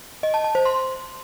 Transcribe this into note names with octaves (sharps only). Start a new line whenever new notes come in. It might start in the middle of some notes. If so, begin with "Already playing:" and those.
D#5
A5
A5
C5
C6